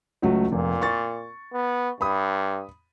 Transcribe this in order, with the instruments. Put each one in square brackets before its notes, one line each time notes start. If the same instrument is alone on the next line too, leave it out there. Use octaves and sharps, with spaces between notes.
[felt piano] C#2 F#3 A3
[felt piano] F1 [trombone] A#2
[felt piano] C#6 A6
[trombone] B3
[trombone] G2 [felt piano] B5 D#6